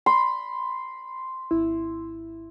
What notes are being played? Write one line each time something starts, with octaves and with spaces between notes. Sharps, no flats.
B5 C6
G#1 E4